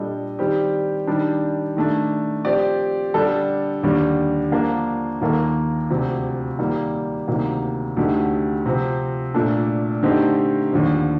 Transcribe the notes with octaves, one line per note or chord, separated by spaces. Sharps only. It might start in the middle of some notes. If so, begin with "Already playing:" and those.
Already playing: A#2 G3 D4 A4 D#5
D#3 G3 C4 G4
D#3 G3 D4
D#3 A3 D4
F3 C4 G4 D5
D3 G3 D4 A4
D#2 D3 G3
D3 F3 A#3 D4
D#2 D#3 A#3 F4 A4
D2 C3 F3 C4
D#3 G3 A#3
D2 C3 D#3 A#3
D2 D3 A3 D#4 G4
C3 F3 C4
A#2 A3 D4 A4
D3 A3 C4 D#4 G4
D#2 D3 F3